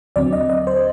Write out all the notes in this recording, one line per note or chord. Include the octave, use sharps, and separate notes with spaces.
D#2 D3 F#3 C4 D5
D#5
D#5
C5